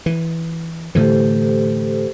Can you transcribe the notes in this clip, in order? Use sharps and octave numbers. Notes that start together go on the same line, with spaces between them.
E3
A2 D3 E3 G4 A4 C5